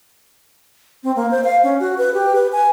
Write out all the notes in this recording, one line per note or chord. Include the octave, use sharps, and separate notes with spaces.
C4
A#3
C5
F5
C#4
F#4
B4
G4
B4
G#5